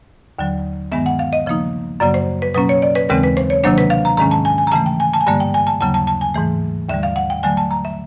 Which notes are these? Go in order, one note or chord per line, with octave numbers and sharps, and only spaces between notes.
D#2 D3 F#3
G2 D#3 G#3 B3 E5
F#5
F5
D#5
C#3 F3 A#3 D#4
F#2 C#3 F#3 A#3 D5
C5
B4
B2 F#3 A#3 C#4 B4
C#5
D5
B4
D#2 C#3 E3 G#3 C4 A#4
B4
C5
C#5
C3 D#3 F#3 A#3 D4 C5
B4
F5
A#5
G#2 D#3 G#3 C#4 A#5
A5
G#5
G#5
A#5
C#3 E3 A3 A5
G5
G#5
A5
G#5
G2 D3 G3 A#3 A5
G5
G#5
A5
D#2 C#3 F#3 A#3 A5
A5
A5
G#5
G#2 E3 A3
D#2 D3 G3 E5
F5
F#5
G5
D3 F#3 A3 G#5
A5
A#5
E5